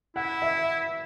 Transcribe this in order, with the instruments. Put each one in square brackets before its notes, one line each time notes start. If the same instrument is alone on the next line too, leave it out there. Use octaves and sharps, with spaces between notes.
[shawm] E4 [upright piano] F#5
[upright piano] E5